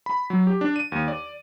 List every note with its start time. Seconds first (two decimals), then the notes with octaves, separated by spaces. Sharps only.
0.06 B5
0.30 F#3
0.47 G4
0.61 D4
0.76 D#7
0.92 D#2
1.08 D5